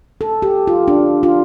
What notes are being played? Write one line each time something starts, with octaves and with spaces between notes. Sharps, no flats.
A4
G4
F4
D4
F4